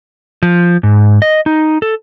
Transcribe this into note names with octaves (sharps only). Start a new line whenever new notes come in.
F3
G#2
D#5
D#4
A4